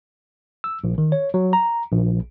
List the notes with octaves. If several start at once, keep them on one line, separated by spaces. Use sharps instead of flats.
E6
A#1
D#3
C#5
F#3
A#5
A#1